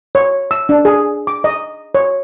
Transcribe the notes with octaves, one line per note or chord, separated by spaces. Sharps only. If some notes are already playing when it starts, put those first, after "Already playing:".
C#5
E6
D4
G#4
D6
D#5
C#5